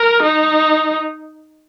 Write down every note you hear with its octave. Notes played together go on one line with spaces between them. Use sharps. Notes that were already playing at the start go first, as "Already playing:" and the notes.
Already playing: A#4
D#4